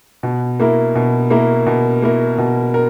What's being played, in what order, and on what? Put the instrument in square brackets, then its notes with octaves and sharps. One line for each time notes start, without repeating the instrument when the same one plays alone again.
[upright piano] B2
A#3 E4 A#4
B2
A#3 E4 A#4
B2
A#3 E4 A#4
B2
A#4